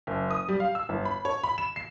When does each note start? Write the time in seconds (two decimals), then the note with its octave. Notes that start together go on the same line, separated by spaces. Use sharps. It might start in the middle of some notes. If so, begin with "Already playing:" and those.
0.07 F#1
0.31 D#6
0.48 G3
0.60 F5
0.75 E6
0.89 G1
1.05 B5
1.25 C#5
1.44 B5
1.58 E7
1.76 C7